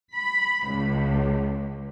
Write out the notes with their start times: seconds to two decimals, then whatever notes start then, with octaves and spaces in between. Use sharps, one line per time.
0.13 B5
0.67 C#2